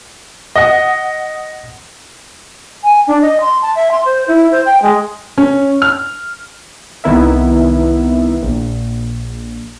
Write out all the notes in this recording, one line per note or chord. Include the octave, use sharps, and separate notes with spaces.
D#5 F#5
G#5
D4
D#5
C6
A5
E5
C6
C5
E4
C5
G5
G#3
C#4
F6
C2 D#3 B3 E4 A#4 E5
A#1